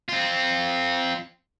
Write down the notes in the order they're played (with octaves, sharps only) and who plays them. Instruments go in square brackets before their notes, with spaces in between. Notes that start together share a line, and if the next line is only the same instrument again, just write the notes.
[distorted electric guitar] C4 F4